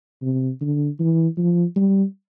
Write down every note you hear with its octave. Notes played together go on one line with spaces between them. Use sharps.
C3
D3
E3
F3
G3